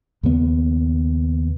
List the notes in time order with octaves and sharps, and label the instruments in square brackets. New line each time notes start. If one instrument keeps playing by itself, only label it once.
[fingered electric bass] D#2 C#3 B3